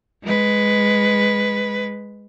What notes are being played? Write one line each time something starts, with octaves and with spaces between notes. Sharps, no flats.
G#3 B4